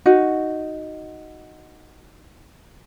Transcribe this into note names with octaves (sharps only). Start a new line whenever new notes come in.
D#4 F#4